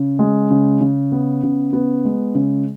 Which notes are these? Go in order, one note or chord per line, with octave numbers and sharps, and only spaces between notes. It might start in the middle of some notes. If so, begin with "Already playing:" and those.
Already playing: C#3
G#3
C#3
C#3
B3
C#3
B3
G#3
C#3